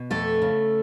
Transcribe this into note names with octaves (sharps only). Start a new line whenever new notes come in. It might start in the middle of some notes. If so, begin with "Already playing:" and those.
Already playing: B2
F2 A3 A4
C#3